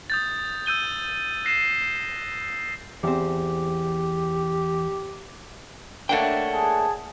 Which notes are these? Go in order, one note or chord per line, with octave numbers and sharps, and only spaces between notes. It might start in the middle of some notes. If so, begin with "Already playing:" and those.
D#6 G6 A6
E6 G6 D#7 G7
F#6 A#6 C7 D#7 E7
E2 C4 G4
A3 A#3 D4 C#5 F#5 G5
G#4 A5